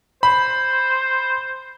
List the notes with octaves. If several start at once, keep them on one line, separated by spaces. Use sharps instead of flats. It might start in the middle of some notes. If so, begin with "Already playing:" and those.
C5 B5